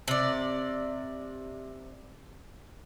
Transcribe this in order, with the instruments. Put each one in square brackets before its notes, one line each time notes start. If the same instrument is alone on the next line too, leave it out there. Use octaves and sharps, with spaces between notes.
[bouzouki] C3 D5